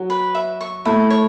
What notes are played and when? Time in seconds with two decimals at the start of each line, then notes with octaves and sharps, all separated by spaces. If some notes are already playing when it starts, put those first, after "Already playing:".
Already playing: F#3
0.10 B4
0.35 E5
0.61 C#6
0.85 A3 E4
1.10 C#5